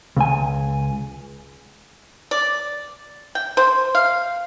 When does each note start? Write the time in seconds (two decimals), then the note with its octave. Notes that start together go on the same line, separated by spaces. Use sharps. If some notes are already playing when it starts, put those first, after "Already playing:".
0.17 C#2 G#5
2.31 D5
3.35 G5
3.57 C5
3.95 F5